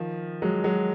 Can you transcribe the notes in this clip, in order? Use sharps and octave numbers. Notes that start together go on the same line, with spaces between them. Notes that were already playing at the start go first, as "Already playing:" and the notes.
Already playing: D#3 F3
F#3 G#3
F#3 G#3